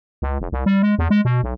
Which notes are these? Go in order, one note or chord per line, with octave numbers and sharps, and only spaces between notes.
C#2
F1
C2
G3
G#3
E2
G#3
B2
B1